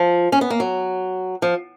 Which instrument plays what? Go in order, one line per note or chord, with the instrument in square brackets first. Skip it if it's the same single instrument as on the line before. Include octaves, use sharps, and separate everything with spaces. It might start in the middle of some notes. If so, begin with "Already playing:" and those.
Already playing: [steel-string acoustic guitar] F3
C#4
B3
A#3
F#3
F3